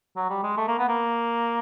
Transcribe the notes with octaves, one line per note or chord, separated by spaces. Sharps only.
F#3
G3
G#3
A3
A#3
B3
A#3